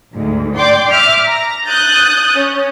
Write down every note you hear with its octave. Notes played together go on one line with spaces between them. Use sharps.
D2 G#2
D5 G5 C6 D6 G6
E5 D6 F6
A#5
D#6 F#6 G6 A6
C#4